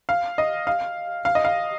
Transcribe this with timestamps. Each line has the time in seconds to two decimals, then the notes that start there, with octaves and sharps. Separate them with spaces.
0.09 F5
0.38 D#5
0.67 F5
1.25 F5
1.35 D#5
1.45 F5